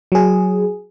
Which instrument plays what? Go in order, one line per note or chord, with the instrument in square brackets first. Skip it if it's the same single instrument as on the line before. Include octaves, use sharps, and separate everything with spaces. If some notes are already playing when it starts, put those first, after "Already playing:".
[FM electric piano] F#3 G#4